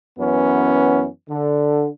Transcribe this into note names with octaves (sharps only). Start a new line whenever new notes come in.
F#2 E3 B3 C#4
D3